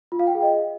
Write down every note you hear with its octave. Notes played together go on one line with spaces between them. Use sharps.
F4
F5
G5
G#4
D#5